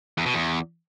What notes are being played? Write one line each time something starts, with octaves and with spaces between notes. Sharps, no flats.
E2
B2
E2